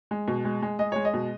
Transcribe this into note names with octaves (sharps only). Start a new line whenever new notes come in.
G#3
B2
G#3
G#3
G#3 D#5
G#3 C#5
D#5
B2